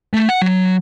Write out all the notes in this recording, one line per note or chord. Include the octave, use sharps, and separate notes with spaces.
A3
F#5
F#3